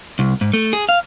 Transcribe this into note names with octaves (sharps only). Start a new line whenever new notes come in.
C2
G#2
A3
G#4
F5